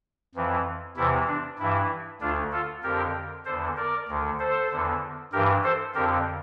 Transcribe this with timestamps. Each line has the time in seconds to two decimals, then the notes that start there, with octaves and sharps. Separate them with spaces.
0.35 F2 E3
0.96 E2 C3 E3 E4
1.27 D4
1.59 G2 E3 E4
2.21 D2 D3 D4 F4
2.52 F4 A4
2.83 F2 D3 G4 A#4
3.45 E2 D3 A4 C5
3.77 A#4 D5
4.08 D2 D3
4.39 A4 C5
4.71 E2 D3
5.33 G2 E3 G4 A#4
5.64 A4 C5
5.95 F2 D3 G4 A#4